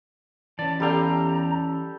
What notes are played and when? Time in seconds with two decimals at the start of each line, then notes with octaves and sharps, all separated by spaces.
0.59 E3 C#4 D5 A5
0.80 E2 G3 G4 A4 F5 G5 A#5